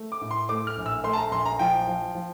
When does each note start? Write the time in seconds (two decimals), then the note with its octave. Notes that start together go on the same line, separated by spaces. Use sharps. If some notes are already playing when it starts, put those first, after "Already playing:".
Already playing: A3
0.12 D6
0.21 A2
0.31 C6
0.49 A3 D6
0.67 F6
0.77 A#1
0.86 E6
1.04 A3 C6
1.13 A5
1.18 A#5
1.31 A#1 C6
1.46 A#5
1.59 F3 G5
1.87 F3
2.15 F3